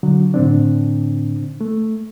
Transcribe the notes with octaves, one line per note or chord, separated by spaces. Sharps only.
D3 F#3
A2 D3 C4 D4
A3